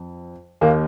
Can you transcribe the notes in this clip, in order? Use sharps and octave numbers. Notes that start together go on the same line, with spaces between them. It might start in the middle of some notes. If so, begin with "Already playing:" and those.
Already playing: F2
D#2 D#3 A#3